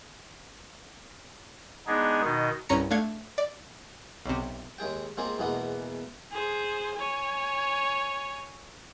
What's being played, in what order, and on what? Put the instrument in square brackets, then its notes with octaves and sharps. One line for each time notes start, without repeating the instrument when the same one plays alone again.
[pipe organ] G#3 B3 D4 D#4 G#4
B2 D#3 D#4
[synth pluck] C2 G2 C#4 A#5 C#7
A3 D4 F5 G#6 C#7
D5
B1 C3
[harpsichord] D#2 G#3 G#4 G5
G#3 A#3 C4 F4 G#4
E2 B2 G#3 A#3 B3
[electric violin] G#4 C5
C#5 G#5